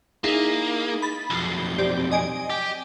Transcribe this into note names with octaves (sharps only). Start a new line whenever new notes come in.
A#3 D#4 E4 G#4
B5 A6
B1 F2 C7 G7
C4 G4 D5
D#5 G#5 D7
G4